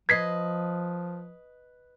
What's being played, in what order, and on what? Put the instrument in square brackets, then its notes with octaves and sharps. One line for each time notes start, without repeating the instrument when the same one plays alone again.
[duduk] F3 [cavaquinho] B4 D#5 [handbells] G#6 B6 C7